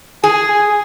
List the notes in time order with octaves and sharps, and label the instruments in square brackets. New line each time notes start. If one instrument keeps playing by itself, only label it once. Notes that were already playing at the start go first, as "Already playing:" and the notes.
[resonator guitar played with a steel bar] G#4 [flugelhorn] G#5